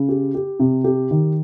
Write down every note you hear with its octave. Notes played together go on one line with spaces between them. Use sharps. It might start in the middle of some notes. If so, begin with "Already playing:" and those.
Already playing: C#3
G4
G4
C3
G4
D#3